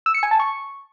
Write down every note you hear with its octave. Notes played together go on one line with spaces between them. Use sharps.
E6
C#7
G#5
A5
C#6